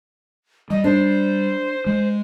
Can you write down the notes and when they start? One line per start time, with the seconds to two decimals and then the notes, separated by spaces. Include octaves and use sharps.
0.70 G3 D#5
0.84 D4 C5
1.86 G#3